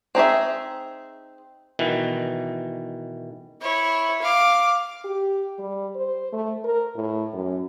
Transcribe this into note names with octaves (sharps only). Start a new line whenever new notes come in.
C4 D#4 G#4 E5
B2 D#3 E3
E4 C#5
F5 D6
G4
G3
C5
A3
A#4
A2
F#2